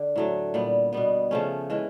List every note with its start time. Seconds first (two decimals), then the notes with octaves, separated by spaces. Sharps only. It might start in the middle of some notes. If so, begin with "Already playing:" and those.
Already playing: D3
0.16 A2 F#3 A3
0.54 A#2 G3 B3
0.93 B2 G3 B3
1.31 C#3 F3 A3 C#4
1.70 E3 G#3 C#4